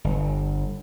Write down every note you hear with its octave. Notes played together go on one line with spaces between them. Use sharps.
G1